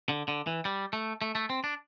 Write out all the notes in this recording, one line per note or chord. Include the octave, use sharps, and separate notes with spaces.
D3
D3
E3
G3
A3
A3
A3
C4
D4